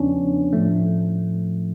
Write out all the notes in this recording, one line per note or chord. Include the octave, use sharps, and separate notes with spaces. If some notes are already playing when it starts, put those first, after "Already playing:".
Already playing: E2 C#3 F3 B3 C#4 D4
A2 F3 A3